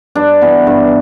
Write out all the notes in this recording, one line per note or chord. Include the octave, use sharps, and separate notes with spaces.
G2 D4
E3 B3
G2